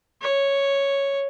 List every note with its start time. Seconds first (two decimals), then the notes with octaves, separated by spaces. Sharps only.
0.22 C#5